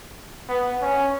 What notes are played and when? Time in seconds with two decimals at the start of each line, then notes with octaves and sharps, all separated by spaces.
0.49 B3
0.82 C#4